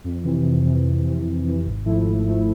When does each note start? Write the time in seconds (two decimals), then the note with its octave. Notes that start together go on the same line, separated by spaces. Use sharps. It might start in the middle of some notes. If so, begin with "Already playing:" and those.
0.04 F2
0.24 C3 E3
0.44 F2
0.65 C3 E3
0.84 F2
1.05 C3 E3
1.25 F2
1.45 C3 E3
1.66 G#1
1.85 G#2 F3 A3 E4
2.05 G#1
2.26 G#2 F3 A3 E4